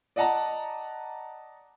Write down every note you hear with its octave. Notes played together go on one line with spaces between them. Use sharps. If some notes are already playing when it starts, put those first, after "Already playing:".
D5 D#5 F#5 A5 A#5